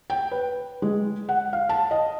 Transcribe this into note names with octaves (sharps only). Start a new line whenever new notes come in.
G5
B4
G#3
F#5
F5
A5
D#5